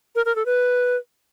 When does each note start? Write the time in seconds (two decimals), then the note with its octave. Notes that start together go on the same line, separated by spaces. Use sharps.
0.15 A#4
0.26 A#4
0.36 A4
0.46 B4